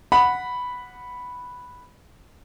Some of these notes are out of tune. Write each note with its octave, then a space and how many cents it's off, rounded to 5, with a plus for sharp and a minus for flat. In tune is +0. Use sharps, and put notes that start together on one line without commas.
F#5 -10 B5 +0